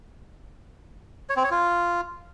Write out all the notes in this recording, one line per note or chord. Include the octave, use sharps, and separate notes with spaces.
C#5
C4
C#5
F4